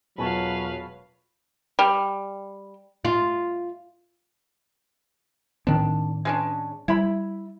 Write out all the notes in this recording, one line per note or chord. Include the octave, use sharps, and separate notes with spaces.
E1 F#3 F4 B4 C#5 F5 A5 B5
G3
F4
A2 D#3 C4 D4
G#3 C#4 D4
G3 E4 B5